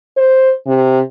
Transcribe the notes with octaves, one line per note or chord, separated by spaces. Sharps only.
C5
C3